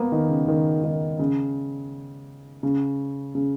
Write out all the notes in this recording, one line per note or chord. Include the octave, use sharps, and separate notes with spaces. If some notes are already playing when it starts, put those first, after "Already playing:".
Already playing: A#3 B3
D#3
C#3
D#3
D#3
C#3
C#3
C#3